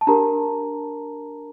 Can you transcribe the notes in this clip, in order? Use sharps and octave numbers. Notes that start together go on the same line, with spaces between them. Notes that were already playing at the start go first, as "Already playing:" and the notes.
A5
D4 G4 A#4 A#5